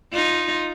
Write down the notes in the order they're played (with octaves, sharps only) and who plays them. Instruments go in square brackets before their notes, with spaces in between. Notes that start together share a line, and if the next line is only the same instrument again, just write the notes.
[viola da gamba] D#4 F4